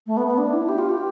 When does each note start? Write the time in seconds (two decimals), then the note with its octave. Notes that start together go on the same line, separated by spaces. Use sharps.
0.07 A3
0.17 B3
0.27 B3
0.38 D4
0.53 E4
0.69 G4
0.79 F4
0.89 G4